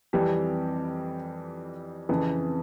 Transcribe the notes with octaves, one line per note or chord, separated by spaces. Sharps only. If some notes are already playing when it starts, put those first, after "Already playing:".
F2 E3 G3 G4
F2 C#3 E3